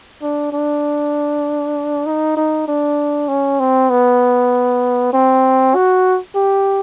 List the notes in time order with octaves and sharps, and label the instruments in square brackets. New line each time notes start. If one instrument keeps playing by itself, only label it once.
[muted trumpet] D4
D4
D#4
D#4
D4
C#4
C4
B3
C4
F#4
G4